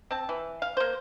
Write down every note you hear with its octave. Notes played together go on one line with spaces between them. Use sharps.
C4 A5
E3
F5
A#3 C5